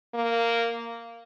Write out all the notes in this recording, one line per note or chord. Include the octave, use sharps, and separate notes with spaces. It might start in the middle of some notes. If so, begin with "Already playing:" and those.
A#3